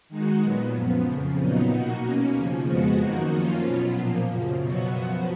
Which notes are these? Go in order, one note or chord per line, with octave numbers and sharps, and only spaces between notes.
D#3 G#3 D#4 F#4
A#2 F#3 B3
F#2 F3 B3
F2 C#3 F3
A#2 F#3 B3 D#4
B2 A#3 D#4 F#4
B2 A#3 C#4
D#2 C#3 F3
F2 F3 G#3 B3 F#4
F#2 D#3 A#3 D#4 F#4
F#2 F3 A#3 C#4 F4
B2 F#3 B3 F4
A#2 F3 A#3
F#2 C#3 F3
B2 F#3 B3 F#4
F#2 F3 B3 F#4